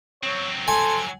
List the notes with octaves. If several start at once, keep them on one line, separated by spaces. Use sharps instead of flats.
F#3 C4 C#5
A4 G#5 C6